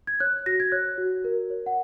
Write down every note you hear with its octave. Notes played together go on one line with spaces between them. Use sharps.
G#6
C#5 F#6
F#4 A#6
G#6
C#5 F#6
F#4
A#4
C#5
F#5